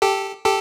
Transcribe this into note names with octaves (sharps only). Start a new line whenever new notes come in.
G4 A4
G4 A4